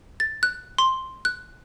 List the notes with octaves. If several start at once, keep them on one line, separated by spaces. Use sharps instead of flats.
A6
F#6
C6
F#6